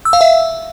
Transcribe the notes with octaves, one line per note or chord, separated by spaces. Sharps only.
E6
F5
E5